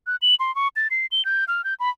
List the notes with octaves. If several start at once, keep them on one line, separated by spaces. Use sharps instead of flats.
F#6
F#7
C6
C#6
A6
C7
G7
G6
F6
G6
B5